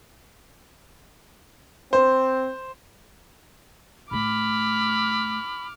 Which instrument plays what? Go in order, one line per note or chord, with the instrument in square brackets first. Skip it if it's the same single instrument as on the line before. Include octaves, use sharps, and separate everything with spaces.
[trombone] C4 [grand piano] C5
[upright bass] A2 A3 [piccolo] B5 [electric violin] D6 F6